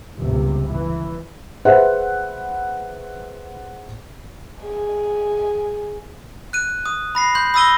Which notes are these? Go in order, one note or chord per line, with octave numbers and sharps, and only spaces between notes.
G1 C#2 C3
E3
G#4 B4 C5 E5 F#5
G#4
F#6 D#7
D#6
B5 A#6 C7
C6 G6
B5 D#6 E6 A#6 D#7 G7